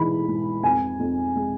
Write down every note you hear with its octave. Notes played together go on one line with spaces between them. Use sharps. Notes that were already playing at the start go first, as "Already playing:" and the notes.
Already playing: G#2 E3 G#3 B5
G#2
F2 G#5
F2
G#3